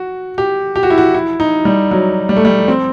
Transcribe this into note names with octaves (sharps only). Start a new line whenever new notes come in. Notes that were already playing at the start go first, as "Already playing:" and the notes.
Already playing: F#4
G4
G4
F#4
E4
F#4
E4
D#4
G3
F#3
G3
A3
G3
C4